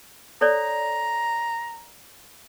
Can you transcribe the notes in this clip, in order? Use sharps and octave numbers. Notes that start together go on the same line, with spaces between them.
A4 C#5 D5 A#5